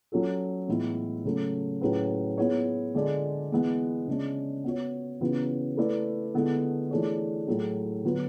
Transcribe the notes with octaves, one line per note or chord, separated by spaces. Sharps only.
F#3 C#4 F#4 A4
A2 E3 G#3 B3 E4
C#3 F#3 A3
A2 F#3 C#4 G#4 B4
B3 E4 G#4 C#5
D3 G#3 D4 G#4 D5
E3 G#3 B3
C#3 G#3 D4
B3 F#4 C#5
C#3 E3 B3 F#4 B4
A3 E4 B4 D5
D3 G#3 B3 E4 A4
E3 A3 D4 G#4 C#5
A2 F#3 A3 E4 G#4
D3 F#3 B3 F#4 B4